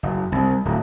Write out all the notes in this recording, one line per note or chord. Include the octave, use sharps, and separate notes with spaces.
F#1
C2
D1